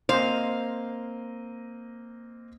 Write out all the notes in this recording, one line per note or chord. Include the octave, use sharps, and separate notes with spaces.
A#3 C4 C5 D#5 F5